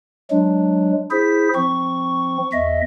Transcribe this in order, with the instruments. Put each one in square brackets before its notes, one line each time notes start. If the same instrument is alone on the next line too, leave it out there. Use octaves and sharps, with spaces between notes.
[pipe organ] F#3 G#3 [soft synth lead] D4
[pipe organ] E4 G#4 C5 [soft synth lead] B6
[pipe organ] F3 C4 [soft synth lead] C#6
[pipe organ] E2 D#5 E5